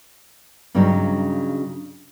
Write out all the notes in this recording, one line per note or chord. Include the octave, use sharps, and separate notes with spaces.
G2 C#3 F#3 D#4